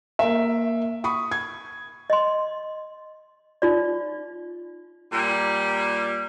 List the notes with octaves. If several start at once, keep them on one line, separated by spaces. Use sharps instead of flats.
A#3 E5
B5 C#6 D#6
G#6
D#5 C6
D#4 F4 D5
A#2 G3